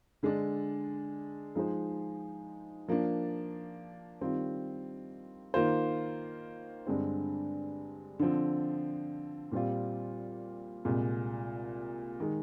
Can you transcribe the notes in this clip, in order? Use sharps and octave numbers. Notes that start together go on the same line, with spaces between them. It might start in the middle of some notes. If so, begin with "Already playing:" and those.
D3 G#3 D4
F3 G#3 D#4 G#4 C5
F3 A#3 D4
D#3 G3 C4 F4
D#3 A#3 F4 C5
G2 D3 G#3 C4
D3 F3 C4
A#2 G3 C4 F4
C2 A#2 G#3
D#3 G#3